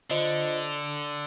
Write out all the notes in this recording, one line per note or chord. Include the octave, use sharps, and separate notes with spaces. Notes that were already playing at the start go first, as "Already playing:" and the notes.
D3 F4 C5 D#5